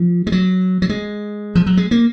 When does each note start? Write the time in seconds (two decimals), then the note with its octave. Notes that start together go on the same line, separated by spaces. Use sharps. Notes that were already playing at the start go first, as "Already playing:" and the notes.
Already playing: F3
0.27 G#3
0.32 F#3
0.82 F#3
0.89 G#3
1.55 F3
1.66 F#3
1.77 G#3
1.91 A#3